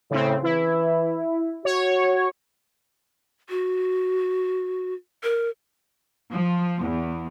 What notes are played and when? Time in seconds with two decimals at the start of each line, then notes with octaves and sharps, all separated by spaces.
0.11 A2 C#3 C4
0.43 E3 E4
1.65 F#4 C#5
3.50 F#4
5.23 A#4
6.31 F3
6.81 E2